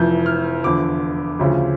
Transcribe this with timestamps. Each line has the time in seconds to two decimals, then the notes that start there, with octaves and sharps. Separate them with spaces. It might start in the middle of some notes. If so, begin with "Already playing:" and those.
Already playing: F1 F2 E3 G6
0.26 F6
0.64 E2 D3 F3 D6
1.39 D2 C#3 F3